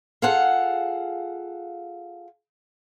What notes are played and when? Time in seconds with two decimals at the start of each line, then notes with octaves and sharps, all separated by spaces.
0.22 F4 G#4 A4 F5 F#5